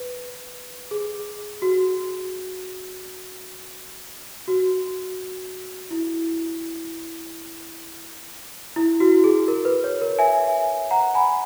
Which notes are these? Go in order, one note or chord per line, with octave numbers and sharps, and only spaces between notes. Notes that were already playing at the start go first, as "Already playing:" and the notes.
Already playing: B4
G#4
F#4
F#4
E4
E4
F#4
G#4
A#4
B4
C#5
A#4
E5 G#5
F#5 A#5
G#5 B5